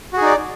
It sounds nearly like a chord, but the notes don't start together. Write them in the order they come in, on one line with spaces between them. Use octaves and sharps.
F#4 G#4 D#4 D5